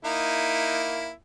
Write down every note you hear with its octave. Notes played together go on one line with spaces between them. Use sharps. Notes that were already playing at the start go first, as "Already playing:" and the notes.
A#3 D#4 E4